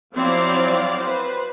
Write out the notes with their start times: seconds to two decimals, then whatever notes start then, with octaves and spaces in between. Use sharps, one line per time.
0.15 F3 F#3 C4 E4 D5 F5
1.00 B4 C5